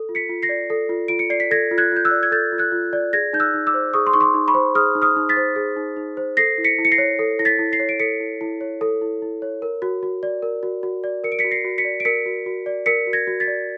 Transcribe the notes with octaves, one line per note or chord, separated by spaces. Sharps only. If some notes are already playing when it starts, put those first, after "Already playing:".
Already playing: A4
F4
B6 C#7
F4
A#6 C7
D5
A4
F4
F4 D7
C#7
D5 C7
B6
A4 G#6 A#6
F4
F#6 G#6
F4 G6
E6 F#6
D5
G#6
A4 G6 A6
F4
F#6 G#6
F4
D5
G#4 G#6 A#6
D#4 G6
E6 F#6
D#4
D6 E6
C5
G#4 C#6 D#6
C6
D#4 C#6
C6 D6
D#4
B5 C#6
C5
G#4 D#6 F6
D#4
D#6 F6
D#4
A6 B6
C5
G#4
D#4
D#4
C5
A4 A#6 C7
E4
B6 C#7
E4
C#7
A#6 C7
C#5
A4
E4 A#6
A6 B6
E4
A#6 C7
C#5
D7
A4 B6 C#7
E4
E4
C#5
A4
E4
E4
C#5
A#4
F#4
F#4
D5
A#4
F#4
F#4
D5
A#4 C#7
D7
B6 C#7
F#4
A#6 C7
F#4
B6 C#7
D5
D7
A#4 B6 C#7
F#4
F#4
D5
A#4 B6 C#7
F#4
G#6 A#6
F#4
A6 B6
D5